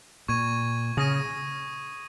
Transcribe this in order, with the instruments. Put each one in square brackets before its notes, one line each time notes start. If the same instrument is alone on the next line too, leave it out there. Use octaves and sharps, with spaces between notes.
[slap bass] A#2 [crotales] C#6 G#6 D#7
[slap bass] C#3 [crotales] D#6 A#6 D#7